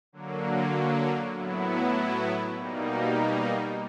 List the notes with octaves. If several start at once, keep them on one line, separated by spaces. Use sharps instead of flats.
D3 F#3 A#3
A2 F#3 B3 E4
B2 G3 A#3 D#4